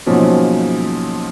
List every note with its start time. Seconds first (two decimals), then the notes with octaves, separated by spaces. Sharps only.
0.06 G#2 B2 F3 F#3 A#3 C#4